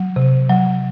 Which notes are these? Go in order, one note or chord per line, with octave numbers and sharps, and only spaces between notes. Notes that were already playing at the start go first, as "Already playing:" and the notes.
Already playing: F#3
C3
F#3